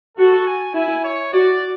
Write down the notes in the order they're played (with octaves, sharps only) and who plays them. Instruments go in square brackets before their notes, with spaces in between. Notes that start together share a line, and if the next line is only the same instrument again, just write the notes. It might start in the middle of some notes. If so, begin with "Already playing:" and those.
[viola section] F#4 [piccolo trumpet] A4
[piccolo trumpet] G#5
[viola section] E4 [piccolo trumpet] G#5
[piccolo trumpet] C#5
[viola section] F#4 [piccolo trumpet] D5